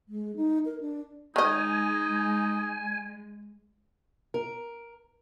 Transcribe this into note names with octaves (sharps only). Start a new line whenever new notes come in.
G#3
D#4
A#4
D4
D#3 G#3 D#4 D#5 G#5
A#4